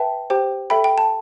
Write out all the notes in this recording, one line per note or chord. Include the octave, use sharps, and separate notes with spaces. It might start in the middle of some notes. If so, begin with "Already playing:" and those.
Already playing: B4 E5 G5 A5
G4 C5 G5
A4 E5 G5 B5
G5
A5